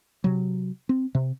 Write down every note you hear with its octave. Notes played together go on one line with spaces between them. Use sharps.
C3 F#3
C4
C3